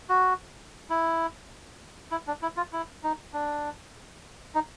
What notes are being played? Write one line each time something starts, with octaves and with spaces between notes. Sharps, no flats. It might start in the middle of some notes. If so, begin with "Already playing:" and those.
F#4
E4
E4
D4
E4
F4
E4
D#4
D4
D#4